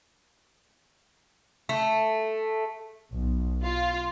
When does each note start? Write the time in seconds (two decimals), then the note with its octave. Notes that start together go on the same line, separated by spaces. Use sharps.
1.69 A3
3.14 B1
3.64 F4